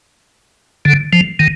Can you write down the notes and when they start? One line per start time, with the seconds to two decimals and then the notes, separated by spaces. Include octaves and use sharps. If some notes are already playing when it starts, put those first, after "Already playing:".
0.85 D3
1.13 F3
1.39 D#3